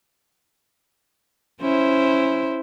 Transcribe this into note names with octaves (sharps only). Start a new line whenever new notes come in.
C#4 E4 C5